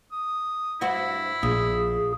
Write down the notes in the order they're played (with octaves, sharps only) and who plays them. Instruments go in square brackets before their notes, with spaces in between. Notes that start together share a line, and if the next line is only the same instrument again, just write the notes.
[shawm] D#6
[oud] G2 F#4 C5 [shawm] E4
[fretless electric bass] A#1 [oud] A#2 [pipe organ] G#4